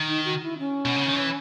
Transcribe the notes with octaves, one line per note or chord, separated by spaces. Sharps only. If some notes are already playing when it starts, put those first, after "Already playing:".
Already playing: D#3
D#4
F#4
E4
C#4
B2
C#3
D#3
E3